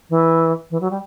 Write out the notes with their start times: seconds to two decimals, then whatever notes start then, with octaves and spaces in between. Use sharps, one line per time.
0.10 E3
0.71 E3
0.81 F#3
0.91 G3